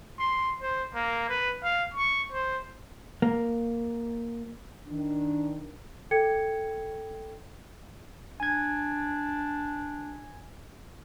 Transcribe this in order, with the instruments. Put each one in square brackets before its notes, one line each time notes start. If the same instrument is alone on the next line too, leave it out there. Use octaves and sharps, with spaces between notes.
[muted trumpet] C6
C5
A#3
B4
F5
C#6
C5
[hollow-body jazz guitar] A#3
[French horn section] D#3 D4
[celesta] A4 G5 G#6 C#7
[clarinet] D4 [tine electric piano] G#5 G#6